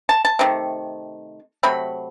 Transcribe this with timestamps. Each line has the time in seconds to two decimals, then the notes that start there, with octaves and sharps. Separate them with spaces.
0.09 A5
0.25 A5
0.39 C3 D#3 A3
1.63 C3 F#3 A3 B5